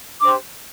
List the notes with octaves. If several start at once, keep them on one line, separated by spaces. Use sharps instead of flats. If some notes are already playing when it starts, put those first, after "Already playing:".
D4 G4 C5 D6